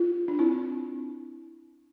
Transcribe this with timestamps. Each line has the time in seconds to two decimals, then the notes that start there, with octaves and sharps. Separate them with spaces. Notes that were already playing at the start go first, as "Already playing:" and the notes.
Already playing: F4
0.28 D4
0.39 C4 E4